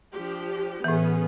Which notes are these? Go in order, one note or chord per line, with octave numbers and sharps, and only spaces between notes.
F3 D4 G4
A2 E3 B3 C#4 G#4